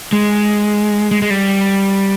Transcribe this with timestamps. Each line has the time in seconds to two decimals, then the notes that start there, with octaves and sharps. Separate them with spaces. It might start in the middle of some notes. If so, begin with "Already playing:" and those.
0.13 G#3
1.11 G#3
1.22 G#3
1.30 G3